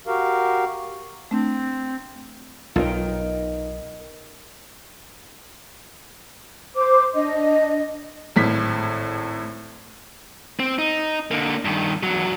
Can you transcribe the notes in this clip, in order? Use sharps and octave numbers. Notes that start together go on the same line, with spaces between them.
F#4 G4 A#4 F5
A3 C4 D4
B1 D#4 F4 A#4 D#5 G5
C5 D6
D4 D#5
G#1 A2 B6
C4
D#4
D3 A#3
G2 D#3
E2 F#3